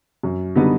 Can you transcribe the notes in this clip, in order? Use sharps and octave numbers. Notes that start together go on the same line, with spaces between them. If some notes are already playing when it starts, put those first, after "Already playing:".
F#2
D3 G3 B3 D#4